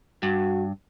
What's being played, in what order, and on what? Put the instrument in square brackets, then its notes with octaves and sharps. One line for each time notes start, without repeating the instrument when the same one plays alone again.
[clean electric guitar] G2 [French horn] F#4